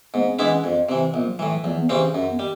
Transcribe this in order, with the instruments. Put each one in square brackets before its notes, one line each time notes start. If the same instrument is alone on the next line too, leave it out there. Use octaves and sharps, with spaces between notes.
[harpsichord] G#2 [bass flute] B3
[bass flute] C4
[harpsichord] E3 G#3 B3 E4 [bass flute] D4
[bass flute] C#4
[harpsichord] F2 [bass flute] C4
[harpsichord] C3 E3 [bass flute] C4
[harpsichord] A#1 [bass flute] B3
[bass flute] F#3
[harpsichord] E3 [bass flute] G3
[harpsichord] A2
[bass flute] F#3
E3
[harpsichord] E2 [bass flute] F3
[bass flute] B3
[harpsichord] C#3 E3 G3 C4
[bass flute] C#4
[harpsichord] F#2 [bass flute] C#4
[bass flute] B3
[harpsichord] G3